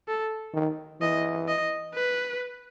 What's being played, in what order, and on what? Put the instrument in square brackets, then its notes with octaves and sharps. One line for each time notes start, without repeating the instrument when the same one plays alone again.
[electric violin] A4
[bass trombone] D#3
[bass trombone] E3 [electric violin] D#5
[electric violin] D#5
B4